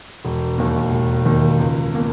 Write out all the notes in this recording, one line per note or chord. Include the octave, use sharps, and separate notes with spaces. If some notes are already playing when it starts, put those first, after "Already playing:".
E1
D#2 D#3 A#3
E1
D#2 D#3 A#3
C#2
B2 A#3